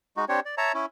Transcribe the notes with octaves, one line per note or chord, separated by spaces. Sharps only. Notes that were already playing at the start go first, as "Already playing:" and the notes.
G#3 D#4 F#4
C4 D4 G4 C#5
D5
C#5 E5 A5 A#5
C#4 E4